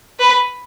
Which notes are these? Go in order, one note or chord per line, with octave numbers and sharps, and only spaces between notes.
B4